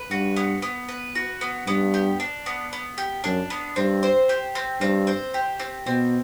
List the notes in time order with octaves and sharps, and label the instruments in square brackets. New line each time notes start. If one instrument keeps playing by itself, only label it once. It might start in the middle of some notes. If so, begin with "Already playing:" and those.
Already playing: [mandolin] B4
[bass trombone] G2 [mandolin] F#4
[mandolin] B3
B3
B4
F#4
B3
[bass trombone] G2 [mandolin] B3
[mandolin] G4
D4
B3
B3
G4
[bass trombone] F#2 [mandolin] D4
[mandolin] B3
[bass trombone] G2 [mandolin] C4
[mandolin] C5
G4
C4
[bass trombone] G2 [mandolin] C4
[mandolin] C5
G4
C4
[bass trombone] B2 [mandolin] C4